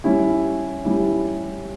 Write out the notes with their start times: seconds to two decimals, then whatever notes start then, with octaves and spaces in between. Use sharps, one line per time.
0.04 G3 C#4 E4
0.85 G3 C#4 E4